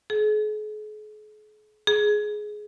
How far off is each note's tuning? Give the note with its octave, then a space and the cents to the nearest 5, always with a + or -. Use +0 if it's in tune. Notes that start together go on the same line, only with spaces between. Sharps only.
G#4 +45
G#4 +15